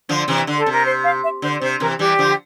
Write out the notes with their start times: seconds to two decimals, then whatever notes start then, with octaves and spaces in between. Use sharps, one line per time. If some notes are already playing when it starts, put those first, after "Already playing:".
0.09 D3 F3
0.28 C3 E3
0.47 D3
0.59 A4
0.66 C3
0.72 A#4
0.85 C5
1.04 F5
1.23 E5
1.42 D3 C5
1.61 C3 C5
1.80 C3 E3 A#4
1.99 E3 G3 G4
2.19 D3 F3